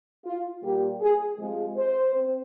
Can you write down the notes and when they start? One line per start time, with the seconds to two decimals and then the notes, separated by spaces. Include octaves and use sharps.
0.25 F4
0.63 A#2 G3 A#3 G4
1.01 G#4
1.38 C3 F3 G#3
1.77 C5
2.14 C4